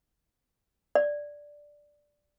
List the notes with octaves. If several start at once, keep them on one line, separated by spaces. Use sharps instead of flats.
D5